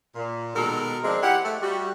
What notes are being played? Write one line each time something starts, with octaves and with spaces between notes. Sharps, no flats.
A#2
B2 D#3 G#3 A4 A#4
F3 G#3 C4 D4
E4 G4 F#5
A3
G3 F#4